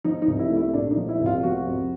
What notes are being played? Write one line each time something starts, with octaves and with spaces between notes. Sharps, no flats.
F3 D#4
D#4
C2
E4
A3
E4
A#2 D4
D#4
F3
E4
C2
F4
F4
F3 F#4
F2